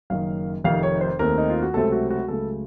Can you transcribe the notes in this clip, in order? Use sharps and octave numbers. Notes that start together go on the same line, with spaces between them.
F#1 F#2 D#3 F5
F1 F2 C3 D#3 F5
C#5
C5
D#2 D#3 A3 C4 A#4
D#4
F4
F#4
C#2 C3 F#3 A3 C4 A4
F#4
F#4
C#2 C#3 F#3 A3 A4